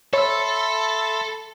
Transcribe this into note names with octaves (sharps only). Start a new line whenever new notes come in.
A4 C#5 E5 B5 C6 E6